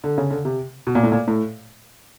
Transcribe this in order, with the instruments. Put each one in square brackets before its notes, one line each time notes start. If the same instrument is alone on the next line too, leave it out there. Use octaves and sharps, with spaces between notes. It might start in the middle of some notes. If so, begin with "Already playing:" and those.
[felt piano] D3
C#3
D3
C3
B2
A#2
A2
A#2
A2